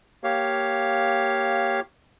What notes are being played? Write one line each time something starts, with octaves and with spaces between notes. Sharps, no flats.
A#3 G4 C#5 F5